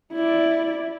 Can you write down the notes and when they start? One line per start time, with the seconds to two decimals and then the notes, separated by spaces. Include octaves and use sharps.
0.13 E4 D5